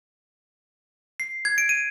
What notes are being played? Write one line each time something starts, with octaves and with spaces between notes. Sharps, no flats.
C7
G#6
D7
D#7